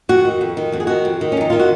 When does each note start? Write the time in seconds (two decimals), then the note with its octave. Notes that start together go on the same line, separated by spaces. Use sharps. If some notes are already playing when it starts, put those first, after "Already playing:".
0.09 F2 F#4
0.25 D#3
0.41 F2
0.57 D#3
0.72 F2 F#4
0.80 G#4
0.87 D#3 F#4
1.05 F2
1.21 D#3
1.32 C#4
1.37 F2 D#4
1.50 D#3 F4
1.60 F#4